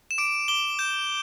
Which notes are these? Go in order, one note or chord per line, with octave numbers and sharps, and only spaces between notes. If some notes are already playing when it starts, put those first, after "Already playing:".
E7
D6 D7
D6 G7
G6 E7